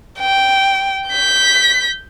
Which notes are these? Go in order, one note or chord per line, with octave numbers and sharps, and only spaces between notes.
G5
G6 B6